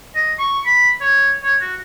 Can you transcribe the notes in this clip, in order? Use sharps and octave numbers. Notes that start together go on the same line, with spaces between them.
D#5
C#6
B5
C#5
C#5
F#4